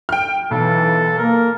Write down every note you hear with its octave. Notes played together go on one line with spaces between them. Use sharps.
G5 F6
B1 E3 A4
A#3 A#4